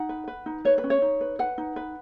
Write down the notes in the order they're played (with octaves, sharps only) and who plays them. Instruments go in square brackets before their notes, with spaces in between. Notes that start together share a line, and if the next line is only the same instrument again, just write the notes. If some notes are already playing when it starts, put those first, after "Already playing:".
Already playing: [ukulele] D#4 F#5
B4
B4
D#4
B4 C#5
B4
C#4
C#5
D#4
B4
B4 F#5
D#4
B4